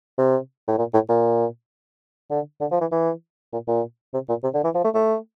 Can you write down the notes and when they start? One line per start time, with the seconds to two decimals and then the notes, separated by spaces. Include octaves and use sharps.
0.18 C3
0.68 A2
0.78 A#2
0.94 A2
1.09 A#2
2.30 D3
2.61 D3
2.71 F3
2.81 E3
2.92 E3
3.52 A#2
3.68 A#2
4.13 C3
4.29 A#2
4.43 C3
4.54 D3
4.64 E3
4.74 F3
4.84 A3
4.94 A3